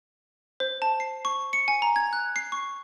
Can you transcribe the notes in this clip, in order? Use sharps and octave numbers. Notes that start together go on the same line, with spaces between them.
C5
A5
C7
C#6
C#7
G#5
A#5
G#6
F#6
C7
C#6